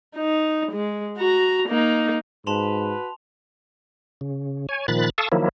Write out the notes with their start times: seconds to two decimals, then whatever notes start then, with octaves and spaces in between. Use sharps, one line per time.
0.16 D#4
0.72 G#3
1.17 F#4 A#5
1.69 A#3 D#4
2.47 G#2 F#4 B4 A5 C6 F7
4.21 C#3
4.69 C#5 G#5
4.88 A#2 D#3 F3 B5 F#6 A6
5.18 A4 F5 A5 C#6 D#6 E6
5.32 D#3 F3 F#3 A#3 E4